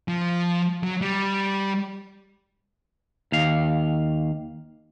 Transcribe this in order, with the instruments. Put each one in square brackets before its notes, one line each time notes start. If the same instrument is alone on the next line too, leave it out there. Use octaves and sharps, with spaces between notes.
[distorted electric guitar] F3
F#3
G3
[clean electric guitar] D#2 F5